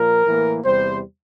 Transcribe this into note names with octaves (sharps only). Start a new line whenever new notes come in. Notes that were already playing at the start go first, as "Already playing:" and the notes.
Already playing: A#2 F3 A#4
A2 E3 A#3
E2 C3 G3 C5